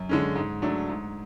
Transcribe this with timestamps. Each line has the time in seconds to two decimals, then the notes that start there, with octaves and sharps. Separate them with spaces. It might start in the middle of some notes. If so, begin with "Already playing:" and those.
Already playing: F#2
0.09 D3 G#3 C#4
0.36 G#2
0.62 F#3 A3 D4
0.89 G#2